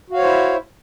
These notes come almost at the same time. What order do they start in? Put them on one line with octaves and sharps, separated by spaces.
F#4 F5 C#5 C5 E4